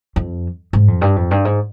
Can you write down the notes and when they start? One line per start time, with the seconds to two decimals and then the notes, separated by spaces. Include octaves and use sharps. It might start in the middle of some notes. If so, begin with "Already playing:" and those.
0.16 F2
0.73 G#2
0.88 F2
1.01 G2
1.16 F2
1.31 G2
1.45 G#2